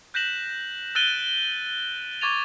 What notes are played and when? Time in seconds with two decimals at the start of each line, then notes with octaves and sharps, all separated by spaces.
0.14 F#6 G6 A#6 B6 E7 F#7
0.95 E6 F#6 A6 D7 D#7 G7
2.21 C#6 D6 G#6 A6 D#7 F7